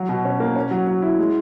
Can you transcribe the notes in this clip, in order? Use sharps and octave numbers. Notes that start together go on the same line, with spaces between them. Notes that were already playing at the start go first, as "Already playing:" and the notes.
Already playing: F#3
B2
C#4
A#3
C#4
F#3
F#3
E4
G#3